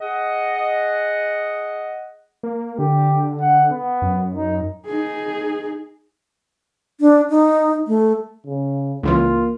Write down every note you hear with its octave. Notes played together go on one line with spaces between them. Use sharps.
G#4 D#5 F#5
A#3
D3 G4
F#5
B3
F#2
D#4
D#4 G#4
D4
D#4
A3
C#3
C#2 C#3 E3 A#3 F4